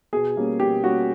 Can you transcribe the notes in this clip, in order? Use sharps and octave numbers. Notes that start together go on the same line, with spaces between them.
B2 G#4
G3 A#3 C#4
B2 G4
G3 A#3 C#4 F#4